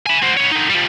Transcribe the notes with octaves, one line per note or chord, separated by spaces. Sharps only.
G#5 B5
F#4 C5
B3 C#5
D3 D#4
F3 G3